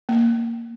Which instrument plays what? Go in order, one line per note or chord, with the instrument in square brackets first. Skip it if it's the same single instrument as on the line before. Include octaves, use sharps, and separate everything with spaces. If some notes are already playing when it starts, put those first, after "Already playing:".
[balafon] A#3